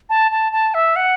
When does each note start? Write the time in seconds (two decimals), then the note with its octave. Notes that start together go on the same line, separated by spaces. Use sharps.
0.10 A5
0.32 A5
0.52 A5
0.74 E5
0.96 F#5